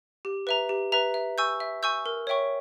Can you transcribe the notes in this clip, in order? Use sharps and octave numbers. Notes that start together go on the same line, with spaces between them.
G4
B4 E5 A#5
G4
B4 E5 A#5
E5
G#5 C#6 E6 G6
E5
G#5 C#6 E6 G6
A#4
C#5 E5 G5 C#6